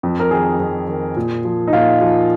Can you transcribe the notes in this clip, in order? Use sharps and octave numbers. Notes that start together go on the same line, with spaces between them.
F2
A#4
D#3 G#4
F2
D#3
A#2
F3
D#4
A#2 F4
F3